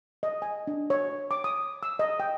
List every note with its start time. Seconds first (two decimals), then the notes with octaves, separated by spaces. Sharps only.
0.23 D#5
0.42 G#5
0.67 D4
0.90 C#5
1.31 D6
1.44 D#6
1.83 E6
1.99 D#5
2.20 G5